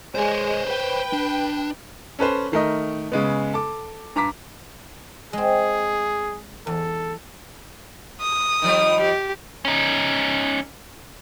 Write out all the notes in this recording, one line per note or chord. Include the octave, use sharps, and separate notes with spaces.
G#3 C5 C#5
B4 G5
D4
C#4 A4 B4 C5
D#3 A3 A#4 D#5
C#3 G#3 B3
A4 D6
G2 A#5 D6 B6
G#3 C4 G#4
E2 A4
D#6
D#3 F3 G3
G4
C#4 D#4